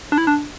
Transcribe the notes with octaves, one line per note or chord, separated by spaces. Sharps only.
D4
E4
D4